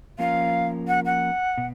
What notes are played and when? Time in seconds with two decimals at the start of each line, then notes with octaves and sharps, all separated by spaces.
0.19 F3 A#3 C#4 F4 A#4 F5
0.88 F#5
1.05 F#5
1.58 B2